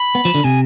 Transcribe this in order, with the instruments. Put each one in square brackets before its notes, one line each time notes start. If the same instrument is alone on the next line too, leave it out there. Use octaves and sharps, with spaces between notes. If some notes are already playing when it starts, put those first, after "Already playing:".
Already playing: [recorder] B5
[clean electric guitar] B3
F3
D3
[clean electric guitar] C3 [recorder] G#5